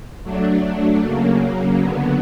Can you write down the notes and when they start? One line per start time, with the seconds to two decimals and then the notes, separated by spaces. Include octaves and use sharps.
0.23 F#3 A3 D4
1.01 C#3 F#3 A#3
1.79 D3 F#3 B3